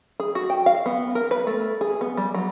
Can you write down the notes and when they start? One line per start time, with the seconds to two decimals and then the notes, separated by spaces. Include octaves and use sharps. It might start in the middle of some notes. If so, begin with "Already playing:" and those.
0.20 G#4
0.35 F#4
0.50 G5
0.66 F5
0.86 B3
1.15 A#4
1.31 B4
1.47 A3
1.81 G#4
2.01 B3
2.17 G3
2.34 F#3